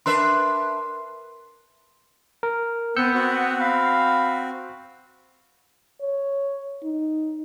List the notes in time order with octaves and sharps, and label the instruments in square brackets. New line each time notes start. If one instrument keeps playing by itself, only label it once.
[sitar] D4 B4 E5 [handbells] A#4 C6
[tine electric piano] A#4
[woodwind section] B3 [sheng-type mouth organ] C4 [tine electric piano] E6 G6 C#7
[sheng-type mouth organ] C4 F#4
[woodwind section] F5 B5
[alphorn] C#5
D#4